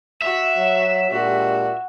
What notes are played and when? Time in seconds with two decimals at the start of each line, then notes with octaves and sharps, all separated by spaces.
0.22 F#4 E5
0.57 F#3
1.11 A#2 G#3 D4 F#4 G4